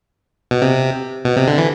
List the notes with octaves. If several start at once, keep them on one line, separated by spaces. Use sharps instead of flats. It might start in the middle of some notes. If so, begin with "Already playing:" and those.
B2
C3
B2
C3
D3
E3